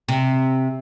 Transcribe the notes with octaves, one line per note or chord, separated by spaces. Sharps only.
C3